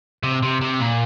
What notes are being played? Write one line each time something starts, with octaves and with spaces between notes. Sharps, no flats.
C3
C3
C3
A#2